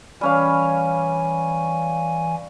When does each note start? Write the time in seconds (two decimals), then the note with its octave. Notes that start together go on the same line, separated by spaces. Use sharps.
0.21 E3 G3 C#4 F5 G#5